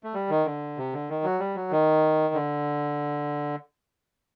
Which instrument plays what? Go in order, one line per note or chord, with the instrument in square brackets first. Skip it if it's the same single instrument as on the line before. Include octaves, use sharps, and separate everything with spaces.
[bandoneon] A3
G3
D#3
D3
C3
D3
D#3
F#3
G3
F#3
D#3
D3